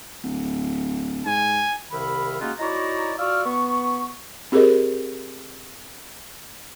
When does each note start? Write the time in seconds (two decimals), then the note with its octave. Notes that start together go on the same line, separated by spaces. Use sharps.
0.24 D1
1.26 G#2 G#5
1.91 C2 C3 D#3 E4 F5 B5
2.40 G#3 A#3 C#4 D#4 F4 F#4
2.59 D#4 E4 F#4 C#5 D5 A#5
3.18 F4 F#4 D5 C#6 E6 F6
3.44 B3 C#6
4.52 C4 G4 G#4 A#4 C5 D#5